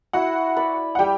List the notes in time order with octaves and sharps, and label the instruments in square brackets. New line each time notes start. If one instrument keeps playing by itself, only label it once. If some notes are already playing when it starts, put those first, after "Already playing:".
[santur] E4 [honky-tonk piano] F#4 F#5
[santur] B4 D5
[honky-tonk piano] F#5
[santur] G3 [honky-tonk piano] G4 G5